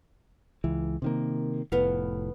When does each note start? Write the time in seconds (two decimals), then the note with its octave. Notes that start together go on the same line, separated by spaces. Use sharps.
0.64 C#2 E3
1.02 C3 D#3 A#3
1.72 F1 A2 B3 F5